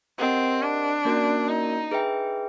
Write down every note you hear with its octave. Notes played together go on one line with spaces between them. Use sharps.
C4 G4 A#4 D#5 F#5
D4
A#3 C#4 F#4 A#4 D5
D#4
G#4 B4 E5 G5